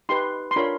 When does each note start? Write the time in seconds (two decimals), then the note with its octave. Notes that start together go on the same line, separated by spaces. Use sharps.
0.09 D#4 G4 B4 C6
0.51 C6
0.56 D4 F4 A#4 C#5 B5